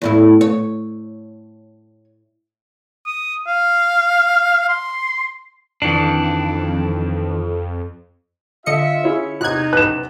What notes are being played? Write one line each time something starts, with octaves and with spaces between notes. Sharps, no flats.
E2 A2 E4
C#5
D#6
F5
C6
F2 D#3 E3 D4
D3 F4 D#5 E5 C#7
C#4 E4 G#4
E2 C3 D#4 F#6 G#6
B1 B4 F#6 E7